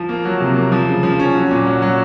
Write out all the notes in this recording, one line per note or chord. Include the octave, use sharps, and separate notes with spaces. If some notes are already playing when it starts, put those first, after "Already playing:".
Already playing: F3
A#3
F#3
C3
A#3
F3
C#3
F3
C#4
F#3
A#2
F#3
F#3